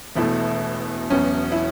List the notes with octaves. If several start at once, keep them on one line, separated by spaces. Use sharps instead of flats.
E1 E2 B2 A3 E4
E1 E2 B2 F#3 C#4
E4